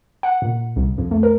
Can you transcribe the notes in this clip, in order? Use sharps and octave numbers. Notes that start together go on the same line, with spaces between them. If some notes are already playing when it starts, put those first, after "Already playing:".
F#5
A#2
C2
F2
A3
A#4